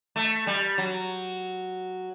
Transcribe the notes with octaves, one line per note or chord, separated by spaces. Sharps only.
A3
G3
F#3